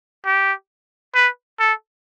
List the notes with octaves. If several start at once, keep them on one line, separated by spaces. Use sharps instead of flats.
G4
B4
A4